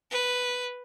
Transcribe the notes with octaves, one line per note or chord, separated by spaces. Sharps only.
B4